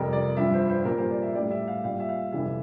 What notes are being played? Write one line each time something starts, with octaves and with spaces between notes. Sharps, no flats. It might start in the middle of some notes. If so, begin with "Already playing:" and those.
Already playing: F2 C3 G3 A#4
D5
G2 F3 E5
C5
C5
A#2 G3 A#4
C5
D5
E5
A2 G3 D5
E5
F5
A#2 G3 F5
E5
F5
F2 C3 E3 G3 E5